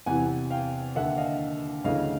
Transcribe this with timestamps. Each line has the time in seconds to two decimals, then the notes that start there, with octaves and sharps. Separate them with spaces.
0.06 E2 C3 E3 F#5 G#5
0.50 F5 G5
0.95 D#2 D3 E5 F#5
1.17 D#5 F5
1.84 D2 C#3 E3 D#5 F5